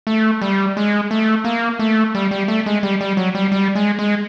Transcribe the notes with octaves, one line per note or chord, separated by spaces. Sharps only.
A3
G3
G#3
A3
A#3
A3
G3
G3
A3
G#3
G3
G3
F#3
G3
G3
G#3
G#3